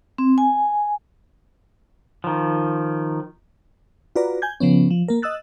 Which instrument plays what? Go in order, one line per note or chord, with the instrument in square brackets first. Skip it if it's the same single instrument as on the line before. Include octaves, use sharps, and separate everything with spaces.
[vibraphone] C4
G#5
[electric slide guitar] D#3 F3
[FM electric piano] F4 F#4 B4 D5 A#5
G#5 G6 G#6
C#3 F3 B3 C#4
F3
A#3 A#4
D#5 D#6 E6 F#6 A6